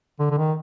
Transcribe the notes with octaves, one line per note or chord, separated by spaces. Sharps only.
D3
D3
D#3